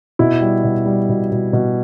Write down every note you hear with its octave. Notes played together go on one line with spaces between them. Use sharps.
B2 E4
G3
B2
G3
B2
B2
B2